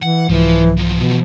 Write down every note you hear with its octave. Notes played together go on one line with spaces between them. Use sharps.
E3 F#5
C2 G#2 E3 F3 F4
E2 F3
B2